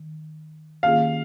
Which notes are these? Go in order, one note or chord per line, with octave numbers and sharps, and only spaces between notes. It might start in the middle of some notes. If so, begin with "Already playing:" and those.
Already playing: D#3
D#3 A#3 C#4 F4 G#4 F5